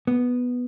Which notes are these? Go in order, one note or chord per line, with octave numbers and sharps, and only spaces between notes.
B3